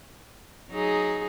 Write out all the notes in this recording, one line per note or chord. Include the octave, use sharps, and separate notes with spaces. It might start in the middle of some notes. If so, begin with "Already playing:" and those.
F#3 D#4 G#4